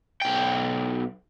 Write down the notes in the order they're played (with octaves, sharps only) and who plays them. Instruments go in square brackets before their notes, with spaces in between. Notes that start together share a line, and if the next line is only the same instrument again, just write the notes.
[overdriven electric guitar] B1 G5